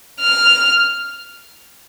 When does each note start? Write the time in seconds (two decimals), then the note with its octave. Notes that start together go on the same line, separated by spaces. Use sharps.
0.20 F6